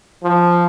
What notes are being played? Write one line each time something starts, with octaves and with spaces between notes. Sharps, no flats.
F3